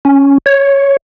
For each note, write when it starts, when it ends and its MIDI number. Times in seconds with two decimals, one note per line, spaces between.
0.05 0.38 61
0.46 0.97 73